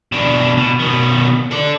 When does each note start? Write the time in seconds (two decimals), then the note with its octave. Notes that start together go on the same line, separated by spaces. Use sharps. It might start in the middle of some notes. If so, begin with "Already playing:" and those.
0.12 B2 D4
0.58 B2
0.80 B2 D#3
1.51 A4 D5